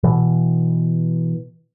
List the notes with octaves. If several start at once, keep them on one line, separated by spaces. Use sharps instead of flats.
B2 E3